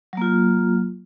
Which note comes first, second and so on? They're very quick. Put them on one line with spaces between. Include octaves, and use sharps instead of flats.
F#3 A#3 F4